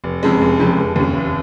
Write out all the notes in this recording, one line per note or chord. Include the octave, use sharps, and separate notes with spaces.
F1
F2 C#3 G#3
F1
F2 C#3 G#3
F1
D#2 C#3
F1